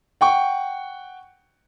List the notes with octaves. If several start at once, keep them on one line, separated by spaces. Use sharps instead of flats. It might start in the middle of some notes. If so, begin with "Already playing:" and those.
F#5 G5 C#6